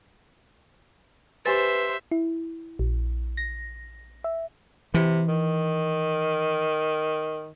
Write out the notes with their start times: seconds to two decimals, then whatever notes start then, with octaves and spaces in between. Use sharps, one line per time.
1.46 G4 B4 C5 E5 G#5 A6
2.11 E4
2.79 A#1
3.37 A#6
4.24 E5
4.94 C3 E3
5.29 D#3